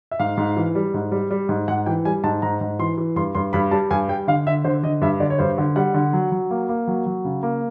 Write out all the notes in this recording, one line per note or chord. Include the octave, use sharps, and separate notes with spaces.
E5
G#2 F5
G#2
E3
G3
G#2
G3
G3
G#2
G#2 F#5
E3 G5
G3 G#5
G#2 A5
G#2 A#5
G#2
E3 C6
E3
G2 C6
G2 C6
G2 B5
G3 A5
G2 G#5
G3 G5
D3 F5
D3 E5
D3 C5
D3 D#5
G2 E5
D3 D5
C#5
G2 C5
D3
G3 F#5
D3
F#3
F#3
A#3
A#3
F#3
F#3
C#3
A#3